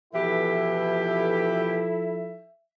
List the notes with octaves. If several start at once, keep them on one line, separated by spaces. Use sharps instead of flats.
B2 E3 F3 E4 G4 A4 E5